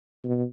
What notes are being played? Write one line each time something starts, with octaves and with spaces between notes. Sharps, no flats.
B2